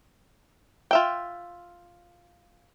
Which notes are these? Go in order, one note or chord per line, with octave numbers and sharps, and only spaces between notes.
F4 E5 G5